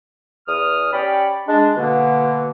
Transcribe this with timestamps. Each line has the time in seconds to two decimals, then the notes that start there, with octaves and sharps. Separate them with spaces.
0.48 E2 D#6 F6
0.93 C#4 G4 C#5 D5 G5 B5
1.48 G#3 D4
1.77 B2 D3 A#3